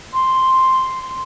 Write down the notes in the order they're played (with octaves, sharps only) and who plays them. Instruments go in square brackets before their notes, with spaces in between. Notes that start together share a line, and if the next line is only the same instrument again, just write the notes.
[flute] C6